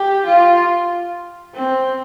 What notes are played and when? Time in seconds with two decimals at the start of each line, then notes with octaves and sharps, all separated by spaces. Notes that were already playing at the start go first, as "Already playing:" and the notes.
Already playing: G4
0.26 F4
1.54 C4